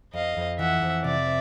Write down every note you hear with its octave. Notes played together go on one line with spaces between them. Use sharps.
F2 D#5 F5
F2
E3 E5 F#5
F2
C3 D5 E5